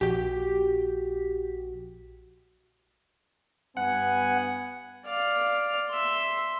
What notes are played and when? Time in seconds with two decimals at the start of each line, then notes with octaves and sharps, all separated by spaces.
0.01 A#1 F#4 G4 G5
3.77 G2 B3 F#5 G#5
5.06 D5 F5
5.90 E5 C6